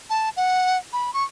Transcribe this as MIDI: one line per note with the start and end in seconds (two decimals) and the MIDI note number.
0.10 0.30 81
0.37 0.78 78
0.93 1.14 83
1.14 1.24 85